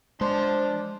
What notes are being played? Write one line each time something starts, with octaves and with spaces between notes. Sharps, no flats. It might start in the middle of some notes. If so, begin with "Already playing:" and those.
F3 G#3 D4 C5 C6